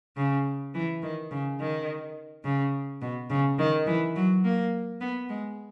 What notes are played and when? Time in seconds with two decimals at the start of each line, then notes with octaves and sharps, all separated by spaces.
0.17 C#3
0.75 E3
1.03 D#3
1.31 C#3
1.60 D#3
2.44 C#3
3.02 B2
3.30 C#3
3.59 D#3
3.87 E3
4.16 F#3
4.44 A#3
5.01 B3
5.29 G#3